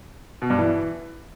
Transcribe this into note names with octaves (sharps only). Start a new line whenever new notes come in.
B2
G2
E3